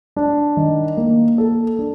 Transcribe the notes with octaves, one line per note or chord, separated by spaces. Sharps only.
D4
D#3
A#3
A4
D4